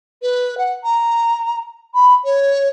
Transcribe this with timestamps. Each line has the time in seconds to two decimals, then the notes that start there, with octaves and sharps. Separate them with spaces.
0.22 B4
0.58 F#5
0.84 A#5
1.94 B5
2.24 C#5